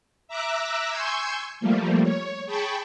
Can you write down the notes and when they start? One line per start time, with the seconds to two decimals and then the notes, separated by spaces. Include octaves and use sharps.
0.28 E5 A#5 D6 E6 F#6
0.90 G#5 C6 C#6 E6 G6 G#6
1.61 F3 G3 A3 A#3
2.02 C#5
2.46 G#4 G5 A5 B5 C#6